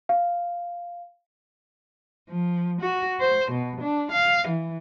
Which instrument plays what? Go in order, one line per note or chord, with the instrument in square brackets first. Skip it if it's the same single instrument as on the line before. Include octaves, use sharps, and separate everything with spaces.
[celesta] F5
[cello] F3
F#4
C5
B2
D4
F5
E3